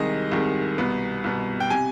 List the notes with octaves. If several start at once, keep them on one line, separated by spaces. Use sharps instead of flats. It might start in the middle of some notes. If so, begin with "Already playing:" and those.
Already playing: C2 C3 D#3 G#3 D#5
C2 C3 D#3 G#3
C2 B2 B3
C2 B2 B3
G5
C3 G#5